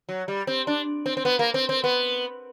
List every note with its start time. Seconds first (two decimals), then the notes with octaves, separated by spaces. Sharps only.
0.09 F#3
0.28 G3
0.47 C4
0.67 D4
1.06 C4
1.17 C4
1.25 B3
1.39 A#3
1.54 C4
1.69 C4
1.84 B3